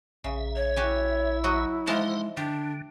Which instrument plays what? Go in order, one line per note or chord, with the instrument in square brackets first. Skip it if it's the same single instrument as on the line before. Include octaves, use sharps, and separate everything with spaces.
[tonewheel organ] A#1 E5 [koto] C#3
[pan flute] C#5
[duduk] E4 [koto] F#4 G4 G#5
[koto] F#3 F#4 D#5
[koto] E3 F3 A5 [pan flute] G#3 [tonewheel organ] D#4 C5 F#5
[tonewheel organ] D3 [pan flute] D4 [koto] G4